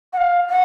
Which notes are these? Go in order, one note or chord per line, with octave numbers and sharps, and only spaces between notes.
F#5
F5
F#5